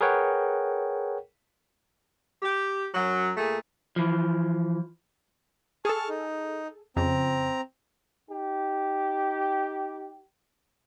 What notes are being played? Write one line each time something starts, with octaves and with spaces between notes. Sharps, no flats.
G#4 A#4 B4 C#5 F#5 G5
G4
F#2 F#3
A#2 A3 G#4
E3 F3
G#4 A4 A5 C#6 F6
D#4
F2 C#3 C4 A#5
D#4 G4